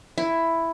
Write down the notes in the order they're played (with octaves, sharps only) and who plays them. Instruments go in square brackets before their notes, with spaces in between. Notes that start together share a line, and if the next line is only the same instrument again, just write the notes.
[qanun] E4